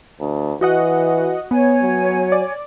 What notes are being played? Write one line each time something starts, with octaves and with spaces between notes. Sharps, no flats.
D2
E3 F#4 D#5 F#5
B3 C#5 G#5
F#3
D5